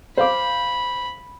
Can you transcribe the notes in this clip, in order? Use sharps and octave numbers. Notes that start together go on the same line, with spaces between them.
C5 F5 B5 D6